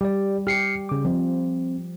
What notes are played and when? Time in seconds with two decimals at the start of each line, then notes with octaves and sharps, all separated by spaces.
0.01 G3 G4 D5
0.47 G4 F6 C7 C#7
0.89 C#3 D6
1.05 F3 C4